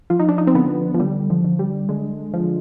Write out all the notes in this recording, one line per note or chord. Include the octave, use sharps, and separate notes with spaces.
F3 F4
D#4
D4
D#4
C4
D3 B3
F3
D3 G3
F3
D3
G3
D3 G#3
F3